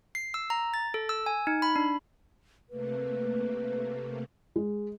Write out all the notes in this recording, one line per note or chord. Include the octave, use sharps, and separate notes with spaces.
C7
E6
A#5
A6
A4
E6
G#5
D#4
B5
D4
C3 A3 A#3 B4
G#3